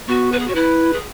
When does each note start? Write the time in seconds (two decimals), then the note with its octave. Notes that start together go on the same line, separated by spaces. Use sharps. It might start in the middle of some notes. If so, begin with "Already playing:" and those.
0.08 B3 F#4
0.32 B4
0.39 G#4
0.47 F#4
0.50 C#5
0.54 E4 B4
0.92 G#4